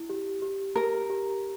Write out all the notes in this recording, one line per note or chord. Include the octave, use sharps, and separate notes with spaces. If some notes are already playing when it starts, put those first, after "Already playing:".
Already playing: E4
G4
G4
G4 A#4
G4